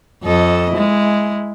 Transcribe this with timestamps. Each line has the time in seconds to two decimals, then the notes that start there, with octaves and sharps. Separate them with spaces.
0.24 F2 A4 D#5
0.72 G#3 E4